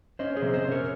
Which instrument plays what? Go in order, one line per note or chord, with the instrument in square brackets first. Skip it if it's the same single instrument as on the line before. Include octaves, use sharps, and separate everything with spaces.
[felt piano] C#4 [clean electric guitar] C5 D#5
[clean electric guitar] G#4 C5
[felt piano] C3
[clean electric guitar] C5 D#5
[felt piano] C#4
[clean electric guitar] A#4 C#5